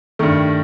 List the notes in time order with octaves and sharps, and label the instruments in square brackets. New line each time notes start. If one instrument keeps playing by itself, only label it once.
[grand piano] G2 D#3 A3